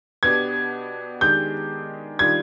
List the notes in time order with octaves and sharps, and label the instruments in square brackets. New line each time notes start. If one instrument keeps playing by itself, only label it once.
[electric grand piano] B2 B3 D4 G4 [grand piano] G#6
[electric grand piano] D#3 G#3 D4 G4 [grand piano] G6
[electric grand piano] D#3 G3 D4 F4 [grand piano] G#6